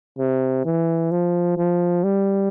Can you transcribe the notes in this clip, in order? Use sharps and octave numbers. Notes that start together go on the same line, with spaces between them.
C3
E3
F3
F3
G3